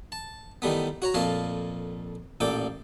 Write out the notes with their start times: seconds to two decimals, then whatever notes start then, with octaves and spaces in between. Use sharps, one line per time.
0.12 A5
0.62 D#3 E3 G3 A3 B3
1.02 F#4 C#5 A#5
1.14 F2 A#2 A3 F5 G#5 A5
2.40 A1 A#2 A4 D5 G5